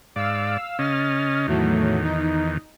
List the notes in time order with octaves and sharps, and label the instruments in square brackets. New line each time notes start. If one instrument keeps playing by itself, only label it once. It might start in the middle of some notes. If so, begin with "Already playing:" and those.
[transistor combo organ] G#2 D5 [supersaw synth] F5 E6
[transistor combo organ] C#3 C#4 D#5 [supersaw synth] F6 A6
[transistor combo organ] E2 D#3 [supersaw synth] A2 F#3 A3
[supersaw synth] D#4